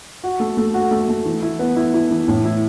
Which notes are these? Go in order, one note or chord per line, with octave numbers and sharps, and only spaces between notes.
F#4
A3
A3
F#4
A3
A3
E3
E4
B3
E4
E4
E3
A2
E4